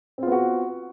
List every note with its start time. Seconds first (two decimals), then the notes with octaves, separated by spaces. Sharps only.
0.18 C4
0.23 F4
0.27 B3
0.32 F#4